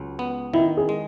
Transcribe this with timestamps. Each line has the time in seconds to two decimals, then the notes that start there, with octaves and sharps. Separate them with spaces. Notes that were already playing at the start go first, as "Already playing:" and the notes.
Already playing: C#2 F#3
0.19 B3
0.54 D#3 E4
0.77 G#4
0.89 G#3